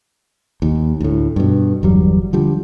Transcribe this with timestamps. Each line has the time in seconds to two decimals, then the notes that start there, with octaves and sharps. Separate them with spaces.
0.62 D#2
1.01 D2 A2
1.36 G2 B2
1.83 G1 E2 F#3 G3
2.33 D3 F3 G3